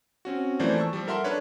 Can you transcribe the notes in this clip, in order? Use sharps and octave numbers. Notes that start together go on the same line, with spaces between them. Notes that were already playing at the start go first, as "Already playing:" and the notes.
C4 C#4 F#4
E3 F3 A3 A#3 C5 D5
A5 C#6 E6
F3 G3
A4 A#4 E5 F#5 C6
D4 A4 B4 C#5